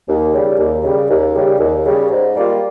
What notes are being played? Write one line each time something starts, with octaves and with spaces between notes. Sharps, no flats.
D#2
C#3 G3
D#2
C#3 G3
D#2
C#3 G3
D#2
C#3 G3
G#2
G3 A#3 F4